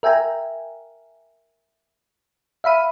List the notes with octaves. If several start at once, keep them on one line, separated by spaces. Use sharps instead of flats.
A#4 E5 G5 G#5 A#5
E5 F5 B5 D#7